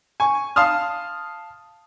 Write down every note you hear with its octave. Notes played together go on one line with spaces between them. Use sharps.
G#5 C#6
F5 A5 C6 D#6 F6